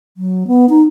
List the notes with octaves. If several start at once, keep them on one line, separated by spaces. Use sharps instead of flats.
F#3
B3
D#4